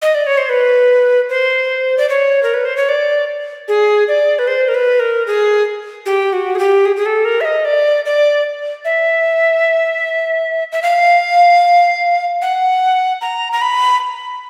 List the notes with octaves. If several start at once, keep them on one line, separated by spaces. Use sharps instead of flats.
D#5
D5
C#5
C5
B4
C5
D5
C#5
A#4
B4
C5
C#5
D5
G#4
D5
B4
C5
A#4
B4
A#4
G#4
G4
F#4
G#4
G4
G#4
G#4
A4
A#4
E5
D#5
D5
D5
E5
E5
F5
F#5
A#5
A#5
B5